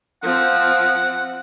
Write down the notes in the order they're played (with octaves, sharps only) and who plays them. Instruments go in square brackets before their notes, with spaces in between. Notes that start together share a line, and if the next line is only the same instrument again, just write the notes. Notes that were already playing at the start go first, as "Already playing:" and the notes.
[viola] F3 C4 [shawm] F#5